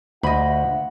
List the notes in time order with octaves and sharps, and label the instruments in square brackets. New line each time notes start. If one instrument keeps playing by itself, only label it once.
[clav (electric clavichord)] D2 [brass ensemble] F4 E5 F#5 [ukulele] D#5 B5